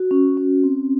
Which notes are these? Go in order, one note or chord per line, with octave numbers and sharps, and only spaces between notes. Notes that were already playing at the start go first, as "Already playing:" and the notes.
Already playing: F#4
C#4
C#4
C4